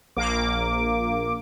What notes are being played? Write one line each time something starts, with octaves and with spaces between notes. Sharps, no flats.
A#1 A#3 D6